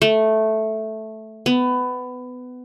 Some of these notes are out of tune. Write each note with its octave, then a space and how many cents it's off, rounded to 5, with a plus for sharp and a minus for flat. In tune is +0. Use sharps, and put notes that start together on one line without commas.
A3 -5
B3 +20